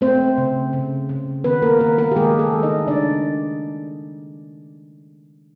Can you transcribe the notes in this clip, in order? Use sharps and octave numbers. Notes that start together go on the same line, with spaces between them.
A3 C4 C5
C#3
C#3
C#3
D#3 B3 B4
A#3 A#4
D#3 B3 B4
A#3 A#4
G4
D#3 G#3 G#4
A3 A4
D#3
D#4 D#5
C#3 D4 D5